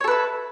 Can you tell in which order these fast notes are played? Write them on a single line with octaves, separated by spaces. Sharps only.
C#5 A4 B4 E5